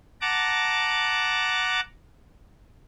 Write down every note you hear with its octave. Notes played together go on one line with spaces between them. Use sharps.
F#5 A5 A#5 D6